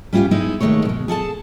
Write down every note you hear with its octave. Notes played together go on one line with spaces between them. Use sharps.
G3 C#4 E4 F4 G4 F5
G#3 B3 D#4 E4
D#2 D#3 E3 G#3 A3 C#5
B2 G#3
G#4 A4 F5 A5